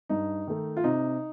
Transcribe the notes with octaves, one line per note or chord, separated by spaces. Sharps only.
G2 D#4
D#3 A3
F4
C3 D#4